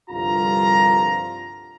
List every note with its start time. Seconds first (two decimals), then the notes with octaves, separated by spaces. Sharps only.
0.10 C2 G2 D3 F3 F4 A#5